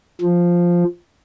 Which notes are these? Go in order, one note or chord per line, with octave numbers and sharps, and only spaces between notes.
F3